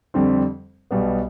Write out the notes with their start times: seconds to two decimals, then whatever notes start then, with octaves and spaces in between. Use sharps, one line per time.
0.14 F2 D3 G3 C4
0.91 B1 B2 G3 B3